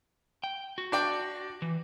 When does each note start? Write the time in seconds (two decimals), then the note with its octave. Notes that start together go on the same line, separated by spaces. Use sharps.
0.44 G5
0.78 F#4
0.92 D4 D5 G5
1.62 E3